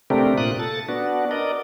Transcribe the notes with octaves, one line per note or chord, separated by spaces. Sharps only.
C3 A3 C4 D4 G4 A#4
A#2 F4 D#6 F#6
A4 A6
B3 D4 F#4
A#4 D5 D#5